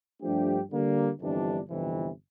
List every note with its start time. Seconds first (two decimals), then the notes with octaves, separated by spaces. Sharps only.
0.22 G2 F3 A3 D4 G4
0.71 D3 G3 A#3
1.20 G1 F2 E3 G3 D4
1.69 G1 F2 C3 E3